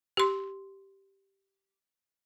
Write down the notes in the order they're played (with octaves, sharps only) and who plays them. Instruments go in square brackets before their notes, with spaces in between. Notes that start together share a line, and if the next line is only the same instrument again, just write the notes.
[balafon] G4 C6